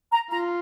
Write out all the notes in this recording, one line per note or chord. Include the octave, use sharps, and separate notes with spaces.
A#5
F4 A#5